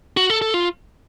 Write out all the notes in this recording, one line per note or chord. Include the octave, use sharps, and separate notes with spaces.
F#4
A4
A4
F4